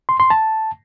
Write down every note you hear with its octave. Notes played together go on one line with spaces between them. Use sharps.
C6
C6
A5